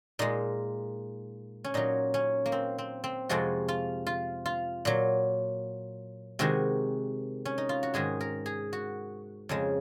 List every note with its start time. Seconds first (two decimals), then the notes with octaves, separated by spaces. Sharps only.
0.19 A#2 G#3 D#4
1.64 C#4
1.74 A#2 F#3 D#4
2.14 C#4
2.46 A#3
2.52 C4
2.78 C4
3.04 C4
3.29 F2 C3 F3 G#3 F#4
3.68 F4
4.07 F4
4.46 F4
4.85 A#2 F#3
6.39 C3 D#3 G#3 F#4
7.45 C#4
7.58 D#4
7.69 F4
7.83 F#4
7.94 G#2 D#3 G#3 G#4
8.21 A#4
8.46 G#4
8.73 F#4
9.49 F2 C#3 G#3